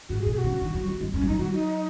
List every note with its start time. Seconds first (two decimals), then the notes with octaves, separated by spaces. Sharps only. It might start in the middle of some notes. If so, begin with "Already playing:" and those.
0.09 G#2 F#4
0.21 G#4
0.26 B2
0.32 G#4
0.37 F#4
0.44 C#3
0.61 D#3
0.74 F#3
0.87 G#3
1.01 G#3
1.14 G#3 C#4
1.21 F#3
1.27 D#3 D#4
1.39 F#3 F#4
1.52 D#4